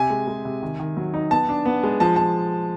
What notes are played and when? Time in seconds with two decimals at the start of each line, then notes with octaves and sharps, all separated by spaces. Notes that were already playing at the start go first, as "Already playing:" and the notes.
Already playing: C3 G#5
0.10 G#3
0.27 G#3
0.45 C3
0.62 D#3
0.80 D#3
0.97 F#3
1.14 D#4
1.31 B3 A5
1.49 D4
1.65 B3
1.83 G#3
2.00 F3 A5
2.16 F3 A5